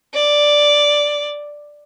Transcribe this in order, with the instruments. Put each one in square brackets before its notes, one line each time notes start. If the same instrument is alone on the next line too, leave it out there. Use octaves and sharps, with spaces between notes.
[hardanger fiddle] D5